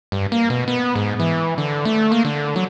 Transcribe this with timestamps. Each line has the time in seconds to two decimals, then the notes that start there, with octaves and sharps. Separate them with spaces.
0.12 G2
0.32 A#3
0.50 B2
0.68 B3
0.95 G#2
1.20 E3
1.58 D3
1.85 A3
2.12 A#3
2.25 D3
2.56 F#3